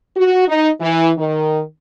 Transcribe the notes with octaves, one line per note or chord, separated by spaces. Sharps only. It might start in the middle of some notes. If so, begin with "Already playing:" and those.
F#4
D#4
E3
D#3